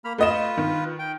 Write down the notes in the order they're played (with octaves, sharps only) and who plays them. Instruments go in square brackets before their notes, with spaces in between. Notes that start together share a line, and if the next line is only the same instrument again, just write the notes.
[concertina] A#3 B5 F6
[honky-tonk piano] A3 D#5 E7 [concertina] F4 B4
[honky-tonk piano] D#3
[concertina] G5